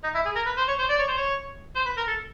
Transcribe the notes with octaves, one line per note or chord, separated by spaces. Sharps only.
D#4
E4
G#4
A#4
B4
C5
C#5
C5
D5
C#5
C5
C#5
C5
B4
A#4
A4